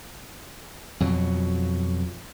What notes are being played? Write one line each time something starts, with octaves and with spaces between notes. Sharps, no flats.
F2 B2 F#3